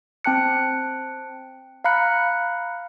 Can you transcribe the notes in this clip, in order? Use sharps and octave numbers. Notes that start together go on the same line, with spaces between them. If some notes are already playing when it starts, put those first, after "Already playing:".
C4 G5 A5 F#6 C#7
F5 A#5 B5 F#6 C#7